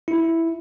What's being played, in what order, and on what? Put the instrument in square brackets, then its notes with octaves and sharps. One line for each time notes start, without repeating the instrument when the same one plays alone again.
[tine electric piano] E4